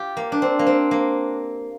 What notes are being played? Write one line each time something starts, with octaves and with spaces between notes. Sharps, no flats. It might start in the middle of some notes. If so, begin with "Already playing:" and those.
Already playing: F4 G4
A#3
D4
C4
A#3
C4
A#3